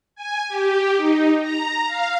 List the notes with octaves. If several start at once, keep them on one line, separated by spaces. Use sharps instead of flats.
G#5
G4
D#4
A#5
F5